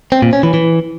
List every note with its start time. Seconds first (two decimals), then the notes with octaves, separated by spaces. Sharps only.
0.12 C4
0.22 A#2
0.33 C#4
0.43 E3
0.54 E3